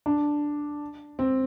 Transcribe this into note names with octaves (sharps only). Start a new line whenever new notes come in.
D4
C4